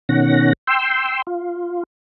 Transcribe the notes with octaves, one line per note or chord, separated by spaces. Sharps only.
B2 D#3 C#4 F#5 A#6
G5 C6 E6
F4